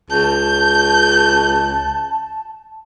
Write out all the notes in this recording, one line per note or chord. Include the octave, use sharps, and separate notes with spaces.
C#2 A5 G6